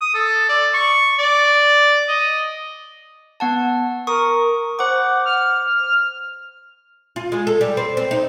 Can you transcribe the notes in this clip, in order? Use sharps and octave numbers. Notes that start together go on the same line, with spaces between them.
D#6
A4
D5
C#6
D5
D#5
B3 F#5 A5
A#4 C#6 D#6
C5 F#5 D6
F6
F4
G#3
A4
G3
C4
C4
D#4